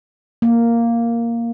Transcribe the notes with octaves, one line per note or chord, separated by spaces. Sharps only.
A#3